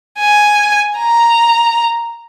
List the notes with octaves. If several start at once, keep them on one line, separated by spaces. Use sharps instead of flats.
G#5
A#5